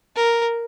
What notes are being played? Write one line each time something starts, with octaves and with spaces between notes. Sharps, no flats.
A#4